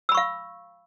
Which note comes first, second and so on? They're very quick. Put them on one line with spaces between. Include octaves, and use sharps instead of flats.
E6 B5 C#6 F5